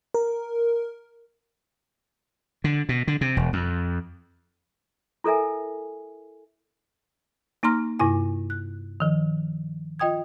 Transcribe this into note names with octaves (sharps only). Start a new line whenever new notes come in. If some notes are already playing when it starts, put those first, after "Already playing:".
A#4
D3
B2
D3
C3
E1
F2
E4 A4 A#4 E5 G#5
A#3 D#4 A#5 C6 F6 A#6
G2 C3 E4 G#5
F#6
D#3 F3
F4 D#5 G5 D#6 G#6